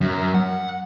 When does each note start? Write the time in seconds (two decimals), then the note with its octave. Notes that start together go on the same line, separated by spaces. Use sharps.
0.01 F#2
0.34 F#5